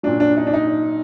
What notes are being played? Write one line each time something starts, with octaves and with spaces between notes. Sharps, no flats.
A#2 F#3 D4
D4
D#4
D4
D#4